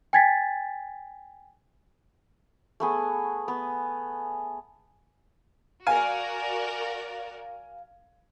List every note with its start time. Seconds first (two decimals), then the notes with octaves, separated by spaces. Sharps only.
0.13 G5 G#5 G#6 A6 B6
2.80 A3 B3 G#4
3.48 B3
5.87 F#4 A#4 D5 F5 G#5